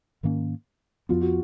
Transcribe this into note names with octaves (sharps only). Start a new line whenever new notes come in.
G#2 D#3 A#3 C#4
F2 F3 B3 F4
F#4